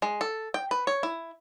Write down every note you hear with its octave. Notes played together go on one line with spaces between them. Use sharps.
G#3
A4
G5
B4
C#5
E4